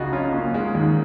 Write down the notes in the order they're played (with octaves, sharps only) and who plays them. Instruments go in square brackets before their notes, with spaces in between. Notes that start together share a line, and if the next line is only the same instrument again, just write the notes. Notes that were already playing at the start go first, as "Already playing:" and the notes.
Already playing: [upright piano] C#2 C#3 [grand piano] D#4 F4 F#4 G#4
[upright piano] F#3 [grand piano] C#4 F4
[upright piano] A#3 [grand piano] C#4
[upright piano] G#3
D#2